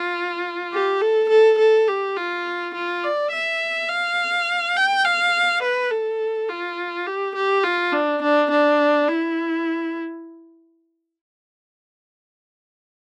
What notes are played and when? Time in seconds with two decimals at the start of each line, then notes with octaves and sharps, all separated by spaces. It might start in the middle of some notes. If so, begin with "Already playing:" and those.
Already playing: F4
0.72 G4
1.01 A4
1.29 A4
1.58 A4
1.88 G4
2.17 F4
2.74 F4
3.04 D5
3.32 E5
3.89 F5
4.76 G5
5.05 F5
5.63 B4
5.91 A4
6.49 F4
7.07 G4
7.35 G4
7.64 F4
7.92 D4
8.22 D4
8.51 D4
9.08 E4